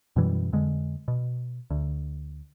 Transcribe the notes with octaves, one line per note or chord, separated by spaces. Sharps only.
F#2 B2 E3 G3
F2 D3 G#3
B2
D2